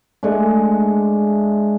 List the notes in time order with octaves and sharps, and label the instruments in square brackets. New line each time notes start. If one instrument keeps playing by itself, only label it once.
[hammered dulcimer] G#3 A3 D4